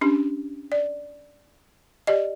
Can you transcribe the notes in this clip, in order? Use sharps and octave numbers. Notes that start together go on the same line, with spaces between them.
C#4 D4 G4
D5
G4 D5 D#5